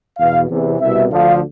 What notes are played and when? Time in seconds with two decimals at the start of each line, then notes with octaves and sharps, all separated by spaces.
0.18 E2 B2 F5
0.49 E2 C3 E3
0.80 C2 B2 E5
1.11 D2 D3 F3 F5